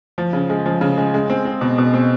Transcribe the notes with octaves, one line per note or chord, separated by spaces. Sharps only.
F3
C#3
G#3
F3
C#3
G#3
G#3
C4
C4
B2
B2
C4